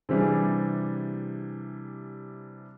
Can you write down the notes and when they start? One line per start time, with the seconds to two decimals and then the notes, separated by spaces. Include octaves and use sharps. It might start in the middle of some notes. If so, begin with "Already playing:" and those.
0.09 C3 E3 G3 D4 G#4